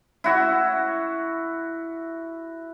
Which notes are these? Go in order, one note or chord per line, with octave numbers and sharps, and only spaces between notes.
E4 F#4 E5